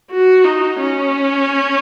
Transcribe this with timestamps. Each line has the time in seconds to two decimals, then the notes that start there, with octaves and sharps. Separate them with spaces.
0.11 F#4
0.44 D#4
0.79 C#4